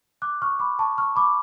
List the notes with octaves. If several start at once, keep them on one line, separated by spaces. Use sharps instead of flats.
D6 F#6
C#6 F6
B5 D6
A5 C#6
C#6 F6
B5 D6